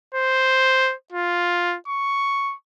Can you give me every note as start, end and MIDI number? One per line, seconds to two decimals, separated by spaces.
0.14 0.94 72
1.12 1.77 65
1.88 2.55 85